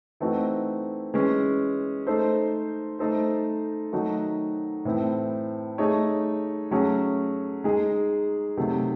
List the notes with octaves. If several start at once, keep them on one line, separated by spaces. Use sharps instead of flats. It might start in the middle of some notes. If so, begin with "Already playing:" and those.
E3 A3 C4 D#4 F#4
E3 G#3 C#4
A3 D#4 A4 C5
A3 D#4 A4 C5
D#3 F#3 A3 D#4 F#4
A2 E3 C4 E4
A3 D#4 G#4 C#5
F#3 A3 C#4 G#4 C#5
G#3 D#4 G#4
C3 D#3 F#3 A3